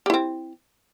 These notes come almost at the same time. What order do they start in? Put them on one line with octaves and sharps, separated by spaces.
G4 E4 C4